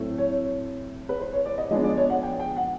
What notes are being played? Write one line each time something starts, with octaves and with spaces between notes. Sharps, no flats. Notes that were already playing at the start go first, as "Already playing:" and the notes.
Already playing: A2 F#3 A3 C4
C#5
B4
C5
C#5
D5
D#5
F3 G#3 B3 D4 D#5
D5
C#5
F#5
G5
G5
F#5